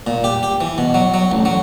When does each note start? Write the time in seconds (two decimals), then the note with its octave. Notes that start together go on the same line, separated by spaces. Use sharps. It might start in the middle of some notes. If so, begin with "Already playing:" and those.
0.07 A#2
0.24 G4
0.43 G4
0.61 E3
0.78 B2
0.94 F#3
1.14 F#3
1.32 A1
1.45 F#3